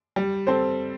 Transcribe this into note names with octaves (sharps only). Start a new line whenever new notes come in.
G3
C4 A4 C5